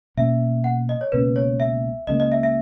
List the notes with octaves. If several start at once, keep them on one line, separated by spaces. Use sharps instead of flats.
B2 A#3 C#4 E5
F#5
D#5
C#5
C#2 B2 A#3 C#4 B4
C#5
E5
C#2 C#3 E3 A#3 D#5
D#5
E5
E5